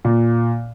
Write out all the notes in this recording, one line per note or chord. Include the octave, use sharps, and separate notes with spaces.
A#2